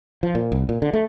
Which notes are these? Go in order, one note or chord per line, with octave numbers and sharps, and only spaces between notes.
F3
A#2
C2
A#2
D3
A3